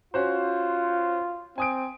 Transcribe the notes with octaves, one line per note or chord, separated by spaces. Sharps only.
C#4 F4 F#4 C5
C4 G#5 D#6 D7